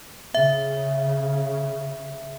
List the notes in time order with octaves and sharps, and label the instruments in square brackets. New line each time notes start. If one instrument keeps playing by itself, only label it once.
[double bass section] C#3 [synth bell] E5